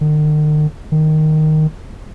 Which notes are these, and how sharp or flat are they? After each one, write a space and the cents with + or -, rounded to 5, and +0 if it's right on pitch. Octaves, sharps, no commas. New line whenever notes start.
D#3 -45
D#3 -5